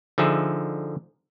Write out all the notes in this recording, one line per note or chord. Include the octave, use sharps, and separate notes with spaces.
D3 F3 D#4 G#4 E5